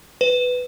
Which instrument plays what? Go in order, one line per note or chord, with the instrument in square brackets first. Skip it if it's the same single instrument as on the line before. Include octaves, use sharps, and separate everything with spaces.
[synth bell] B4